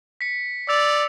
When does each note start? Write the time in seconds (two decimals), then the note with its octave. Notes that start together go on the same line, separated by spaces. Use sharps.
0.21 B6 C#7
0.69 D5 E6 A6 F7